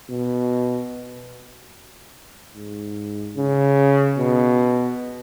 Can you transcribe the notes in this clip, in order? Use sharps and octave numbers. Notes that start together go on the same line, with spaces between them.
B2
G#2
C#3
B2